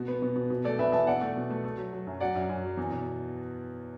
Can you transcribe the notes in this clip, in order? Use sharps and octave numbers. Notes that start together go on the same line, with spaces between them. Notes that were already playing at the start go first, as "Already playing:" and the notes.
Already playing: B2 F#4
B3
B2
B2
B2
A3 A4 D5
B2 B4 E5
E2 E5 A5
B2 D5 F#5
A3
B2
A3
A3
F#3
F#3
F#2
F#3 D5 F#5
F#2
F#2
F#3
E2
B2